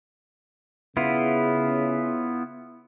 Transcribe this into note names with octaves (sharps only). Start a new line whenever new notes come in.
C#3 B3 E4 F4